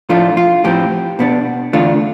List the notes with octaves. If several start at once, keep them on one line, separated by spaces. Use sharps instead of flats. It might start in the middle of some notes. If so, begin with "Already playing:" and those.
A2 F3 A3 D4 F4
F4
A2 F3 C4 G4
B2 B3 D4
E2 D3 A3 D4 F4